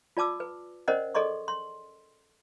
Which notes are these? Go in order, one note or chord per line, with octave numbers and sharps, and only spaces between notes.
F4 D5 A5 D6 E6
B4
C#4 A#4 C5 D5 D#5 F#5
G#4 A4 D5 D#5 C6 C#6
C6